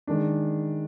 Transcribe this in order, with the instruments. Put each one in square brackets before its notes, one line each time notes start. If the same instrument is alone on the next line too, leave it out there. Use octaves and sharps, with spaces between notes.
[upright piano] D#3 G#3 D4